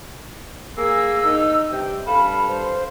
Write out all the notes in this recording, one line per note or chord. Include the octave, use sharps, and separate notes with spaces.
A#3 G#4 E6
D#4
G2 C3 G5
G2 A4 F5 B5
C5